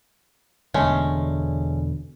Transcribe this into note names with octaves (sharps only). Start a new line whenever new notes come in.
E1 B2 D3 G#3 A3 C#4